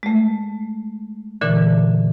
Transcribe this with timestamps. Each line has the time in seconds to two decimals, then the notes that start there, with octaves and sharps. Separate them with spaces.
0.03 G#3 A3
1.41 A#2 D3 E3